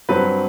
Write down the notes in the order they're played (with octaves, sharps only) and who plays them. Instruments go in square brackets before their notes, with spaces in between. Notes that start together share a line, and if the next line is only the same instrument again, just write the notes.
[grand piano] G2 F#3 C4 B4